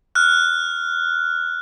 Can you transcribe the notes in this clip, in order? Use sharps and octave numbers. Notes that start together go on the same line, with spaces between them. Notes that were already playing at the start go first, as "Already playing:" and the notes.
F6 F#6